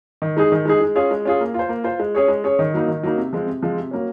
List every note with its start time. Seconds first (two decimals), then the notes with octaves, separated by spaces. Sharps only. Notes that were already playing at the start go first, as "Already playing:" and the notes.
0.22 D#3
0.37 G#3 D#4 G#4
0.52 D#3
0.65 G#3 D#4 G#4
0.81 G#3
0.95 C#4 F4 G#4
1.11 G#3
1.25 C#4 F4 G#4
1.41 A#3
1.54 F4 C5
1.69 A#3
1.84 F4 C5
2.00 G#3
2.15 C#4 G#4 C#5
2.28 G#3
2.44 C#4 G#4 C#5
2.59 D#3
2.74 F#3 A#3 D#4
2.88 D#3
3.03 F#3 A#3 D#4
3.17 C3
3.33 F3 G#3 C4
3.47 C3
3.63 F3 G#3 C4
3.77 C3
3.91 F#3 A#3 C#4